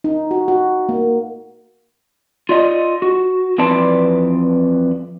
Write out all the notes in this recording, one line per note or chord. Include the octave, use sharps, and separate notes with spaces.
D#4
F#4
F#4
A#3
F4 D5 D#5
F#4
F2 E3 C4 B4 D5 A5